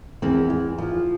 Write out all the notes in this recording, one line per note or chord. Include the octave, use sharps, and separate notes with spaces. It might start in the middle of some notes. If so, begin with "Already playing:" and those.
E2 C4
E2
F3